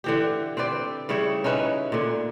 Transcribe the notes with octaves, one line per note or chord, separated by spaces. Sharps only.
D3 E3 G4
C4 G4 B4 D5
C#3 G3 E4 C#5
C#4 D#4 E4 B4
A#2 D3